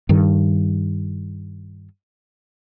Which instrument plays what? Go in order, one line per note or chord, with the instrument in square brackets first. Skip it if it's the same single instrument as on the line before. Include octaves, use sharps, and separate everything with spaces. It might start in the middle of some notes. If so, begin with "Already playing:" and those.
[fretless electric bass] G2 D#3